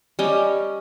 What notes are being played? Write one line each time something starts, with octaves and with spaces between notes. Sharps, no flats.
G3 C#4 D#5